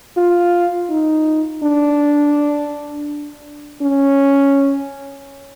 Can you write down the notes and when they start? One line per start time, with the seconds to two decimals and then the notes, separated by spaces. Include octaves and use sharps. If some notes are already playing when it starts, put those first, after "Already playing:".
0.17 F4
0.90 D#4
1.63 D4
3.82 C#4